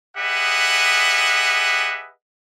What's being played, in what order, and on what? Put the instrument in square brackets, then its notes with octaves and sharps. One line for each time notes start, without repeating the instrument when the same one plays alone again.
[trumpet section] G4 G#4 B4 D#5 E5 F#5